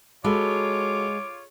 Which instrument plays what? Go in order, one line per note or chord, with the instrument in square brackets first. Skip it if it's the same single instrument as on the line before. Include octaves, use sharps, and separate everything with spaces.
[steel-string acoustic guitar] G#3 [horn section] F4 C#5 [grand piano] F#4 A4 B5 [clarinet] D6